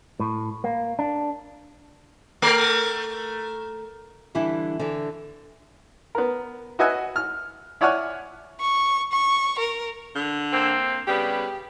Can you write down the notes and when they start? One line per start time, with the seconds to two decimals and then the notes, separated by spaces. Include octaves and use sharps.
0.20 A2
0.64 A#3
0.99 D4
2.42 A3 A#4
4.35 D3 E3 G3 D4 E4
4.79 D3 E3
6.15 B3 A#4
6.79 F#4 B4 D#5 E5 F#5 G#5
7.16 F6
7.81 E4 C#5 D5 F#5 G#5 F6
8.60 C#6
9.12 C#6
9.59 A#4
10.15 D3
10.52 A#3 C4
11.07 C#3 G3 B3 G4